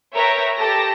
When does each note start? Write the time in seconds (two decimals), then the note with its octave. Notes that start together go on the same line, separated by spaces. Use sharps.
0.15 A#4 B4 C#5 E5 G5 A#5
0.58 G4 A4 A5 A#6